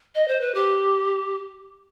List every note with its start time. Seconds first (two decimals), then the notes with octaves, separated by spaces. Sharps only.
0.15 D#5
0.28 C5
0.41 B4
0.55 G4